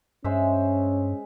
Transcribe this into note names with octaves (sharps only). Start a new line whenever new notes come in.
G2 G#3 C#4 C5 E5